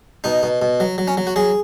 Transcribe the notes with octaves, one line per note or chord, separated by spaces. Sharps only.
B2 D#4
B2
B2
F#3
F#3
C#4
F#3
F#4
F#3 G#4